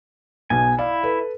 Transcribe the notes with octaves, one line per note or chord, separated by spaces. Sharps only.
B1 B2 G#5
E4 D5 F5
A4 B4